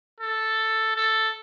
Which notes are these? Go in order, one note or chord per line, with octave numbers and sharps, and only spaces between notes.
A4
A4